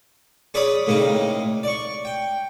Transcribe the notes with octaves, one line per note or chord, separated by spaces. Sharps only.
C#4 G#4 B4 D5 B5 D#6
A2 C#3 A#3 C4 D#4
D5 C#6
G5